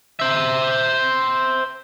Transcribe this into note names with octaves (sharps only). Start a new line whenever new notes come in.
C5 E5